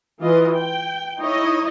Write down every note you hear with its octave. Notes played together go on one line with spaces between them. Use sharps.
E3 F4 D#5
G5
D#4 E4 C#5 D#5